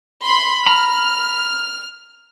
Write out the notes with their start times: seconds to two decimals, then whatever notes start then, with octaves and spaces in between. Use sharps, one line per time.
0.24 B5 C6
0.66 A#5 B5 F6